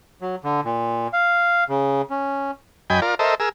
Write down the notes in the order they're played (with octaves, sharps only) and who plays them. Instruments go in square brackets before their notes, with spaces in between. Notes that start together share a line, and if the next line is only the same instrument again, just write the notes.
[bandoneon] F#3
D3
A#2
F5
C#3
C#4
[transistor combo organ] F#2 D#5 G5 G#5 B5
F4 A#4 D5
A4 A#4 C5 D#5 E5
G#4 A#4 E6